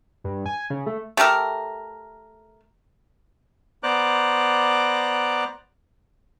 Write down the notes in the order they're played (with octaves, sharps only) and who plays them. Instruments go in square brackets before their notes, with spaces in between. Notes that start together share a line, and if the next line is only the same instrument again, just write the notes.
[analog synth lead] G2
G#5
C#3
A3
[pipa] A3 G4 A4 A#4
[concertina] B3 C5 D5 A#5 D6 F#6